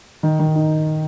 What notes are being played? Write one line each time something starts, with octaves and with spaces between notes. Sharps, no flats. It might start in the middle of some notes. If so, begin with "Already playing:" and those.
D#3
D#3
D#4